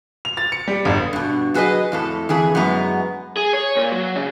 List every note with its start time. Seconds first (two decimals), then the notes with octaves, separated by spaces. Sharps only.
0.25 F7
0.37 A6
0.52 C#7
0.68 G3
0.85 G1
1.13 G2 B2
1.54 F#3 F#4 G#4 A#4 B4 D#5
1.92 F2 A2 A4
2.29 F2 E3 G#4
2.55 F#2 G#3 B3 A#5
3.37 G#4
3.53 C#5
3.77 A#2
3.92 F#3
4.16 C#3